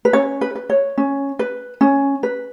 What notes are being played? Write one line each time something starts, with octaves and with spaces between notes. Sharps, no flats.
B4
C#4 C#5
B4
B4
C#5
C#4
B4
C#4
B4